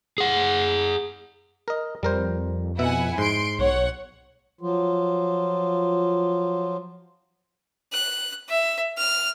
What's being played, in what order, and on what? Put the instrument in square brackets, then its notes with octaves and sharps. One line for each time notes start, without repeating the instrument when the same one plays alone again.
[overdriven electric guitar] G#4 F#5
[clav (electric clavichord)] A#4 D#5
[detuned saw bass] F2 [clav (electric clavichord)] G3 A#4 C5
[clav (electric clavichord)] B2 E5 [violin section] E4 F#5 G#5
[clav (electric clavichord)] G#2 [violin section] C6 D7
[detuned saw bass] B1 [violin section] C#5 F#5
[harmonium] F3 F#3 F4
[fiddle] F#6
E5
F6